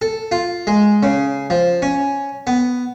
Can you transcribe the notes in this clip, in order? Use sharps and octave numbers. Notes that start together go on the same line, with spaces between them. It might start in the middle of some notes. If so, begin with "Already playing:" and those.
A4
F4
G#3
C#3
F3
C#4
B3